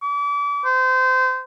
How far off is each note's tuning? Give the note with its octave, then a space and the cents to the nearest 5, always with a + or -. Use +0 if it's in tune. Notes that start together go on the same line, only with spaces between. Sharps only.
D6 -35
C5 -25